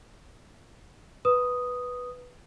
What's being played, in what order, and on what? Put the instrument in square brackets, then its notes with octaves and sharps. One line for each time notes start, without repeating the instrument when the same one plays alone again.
[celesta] B4 D#6